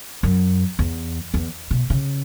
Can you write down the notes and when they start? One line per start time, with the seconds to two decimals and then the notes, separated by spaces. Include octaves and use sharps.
0.23 F#2
0.79 E2
1.34 E2
1.71 B2
1.90 C#3